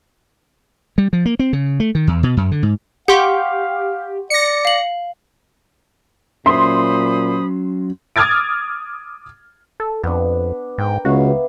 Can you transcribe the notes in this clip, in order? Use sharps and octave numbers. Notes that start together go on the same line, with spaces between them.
G3
F3
A#3
C4
C#3
A3
D#3
E2
B2
F#2
D3
G#2
G4 F5 F#5 C6 C#6
D5 A#6 C#7
F5 F#7
A#2 F#3 C#4 C5 E5 B5 C6 D#6
D6 D#6 F6 G#6 A6 D7
A4
F2 B3 D4
G#2 A#4 G5
C#2 C#3 B3 F#4 E5 F5